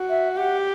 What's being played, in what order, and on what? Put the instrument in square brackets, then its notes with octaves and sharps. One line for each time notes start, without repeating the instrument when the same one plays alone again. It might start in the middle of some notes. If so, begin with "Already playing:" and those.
Already playing: [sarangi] F#4
[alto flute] E5
[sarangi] G4 [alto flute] F#5